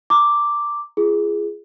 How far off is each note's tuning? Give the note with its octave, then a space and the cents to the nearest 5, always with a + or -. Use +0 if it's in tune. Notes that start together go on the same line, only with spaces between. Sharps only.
A#5 -15 D6 +0
F4 -40 G#4 +0